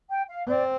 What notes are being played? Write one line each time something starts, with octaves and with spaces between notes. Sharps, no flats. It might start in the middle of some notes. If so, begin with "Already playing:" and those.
G5
F5
C4 D5